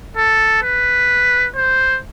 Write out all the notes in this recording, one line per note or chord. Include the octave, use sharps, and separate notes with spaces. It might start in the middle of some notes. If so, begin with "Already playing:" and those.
A4
B4
C5